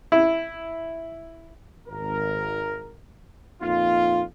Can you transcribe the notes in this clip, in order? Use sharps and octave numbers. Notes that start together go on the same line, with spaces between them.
E4
G#1 A#4
F2 A#2 A#3 D#4 F4